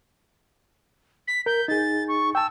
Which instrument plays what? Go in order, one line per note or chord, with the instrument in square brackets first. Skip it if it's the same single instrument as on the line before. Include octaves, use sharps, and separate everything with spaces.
[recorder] B6
[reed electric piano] A#4 [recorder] G6
[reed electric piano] D#4 G#4 [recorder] A6
[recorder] C#6
[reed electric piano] G5 A5 [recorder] E6